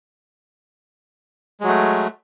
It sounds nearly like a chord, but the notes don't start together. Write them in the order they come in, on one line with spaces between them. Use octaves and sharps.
G#3 F#3 A3